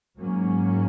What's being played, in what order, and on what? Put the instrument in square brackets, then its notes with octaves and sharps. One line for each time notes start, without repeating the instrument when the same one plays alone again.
[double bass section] G#2 F#3 A#3 C#4